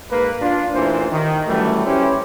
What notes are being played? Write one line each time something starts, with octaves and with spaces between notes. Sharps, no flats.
G#2 A#3 B4
D4 F4
A1 A#2 E3 C5
D#3
F#2 E3 G3 A3
C#4 E4 G4 B4 C5